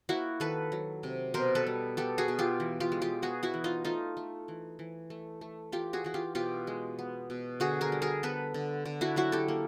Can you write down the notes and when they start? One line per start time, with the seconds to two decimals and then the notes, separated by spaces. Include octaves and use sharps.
0.09 A#3 E4 F#4
0.40 D#3 A4 B4
0.72 F#3
1.03 C3
1.34 B2 A#4 C5
1.55 A4 B4
1.67 G3
1.97 B3 G4 A4
2.18 F#4 G#4
2.28 B2
2.39 F4 G4
2.60 E3
2.80 F4 G4
2.92 G#3
3.02 F4 G4
3.22 B3 F#4 G#4
3.43 E4 F#4
3.54 E3
3.64 D#4 F4
3.85 A3 D#4 F4
4.17 A3
4.48 E3
4.79 E3
5.10 A3
5.41 A3
5.72 E3 F4 G4
5.93 F#4 G#4
6.04 E3 F#4
6.14 F4 G4
6.35 B2 F4 G4
6.67 G#3
6.99 B3
7.30 B2
7.60 D3 F#4 G#4
7.81 G#4 A#4
7.92 G3
8.02 G#4 A#4
8.23 B3 A4 B4
8.54 D3
8.85 D3
9.01 E4 F#4
9.16 F#3 E4 F#4
9.32 G4 A4
9.48 A#3